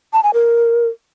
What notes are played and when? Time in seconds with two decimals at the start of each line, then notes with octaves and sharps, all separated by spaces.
0.13 A5
0.23 G#5
0.34 A#4